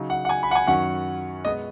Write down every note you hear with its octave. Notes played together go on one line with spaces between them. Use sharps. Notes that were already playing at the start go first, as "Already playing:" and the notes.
Already playing: C#3 F#3 D#4
F#5
F#5
G#5
B5
F#5
G#5
F#2 D#3 F#3 C#4 F#5
B2 G#3 B3 D#5